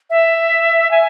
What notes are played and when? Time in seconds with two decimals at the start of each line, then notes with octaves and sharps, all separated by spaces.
0.10 E5
0.91 G#5